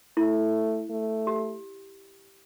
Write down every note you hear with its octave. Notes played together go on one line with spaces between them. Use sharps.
A3 E4
A3
G4